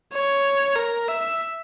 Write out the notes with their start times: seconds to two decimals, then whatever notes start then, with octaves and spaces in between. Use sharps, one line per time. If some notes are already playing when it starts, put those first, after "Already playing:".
0.13 C#5
0.76 A#4
1.08 E5